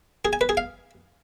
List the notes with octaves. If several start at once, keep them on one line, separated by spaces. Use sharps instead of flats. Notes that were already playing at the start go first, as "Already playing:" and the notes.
G#4
G#5
B4
G#4
F5